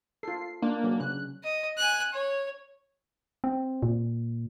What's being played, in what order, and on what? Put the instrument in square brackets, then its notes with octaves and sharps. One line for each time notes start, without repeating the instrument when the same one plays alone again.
[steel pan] F4 A4 [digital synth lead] C7
[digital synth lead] A#3 [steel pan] D4
[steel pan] F#3 C#4
[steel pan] C#3 [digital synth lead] F#6
[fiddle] D#5
G#5 F#6
C#5
[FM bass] C4
A#2